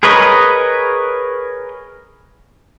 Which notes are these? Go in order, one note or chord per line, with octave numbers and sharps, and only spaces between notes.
G#4 A#4 B4 C#5 D#5